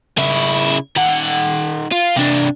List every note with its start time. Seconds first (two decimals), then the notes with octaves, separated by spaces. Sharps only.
0.18 C#3 E4
0.97 D#3 F#5
1.91 F4
2.16 C3 D4